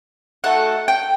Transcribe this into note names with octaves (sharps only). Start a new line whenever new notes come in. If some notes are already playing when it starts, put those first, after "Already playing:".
A3 D#4 F#4 A4 F#5
G5